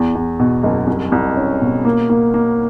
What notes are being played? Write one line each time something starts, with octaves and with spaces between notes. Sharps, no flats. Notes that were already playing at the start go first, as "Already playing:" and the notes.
Already playing: E2
E2
B2
F#1
C2
C2
C#4
B2
A#3
A#3
A#3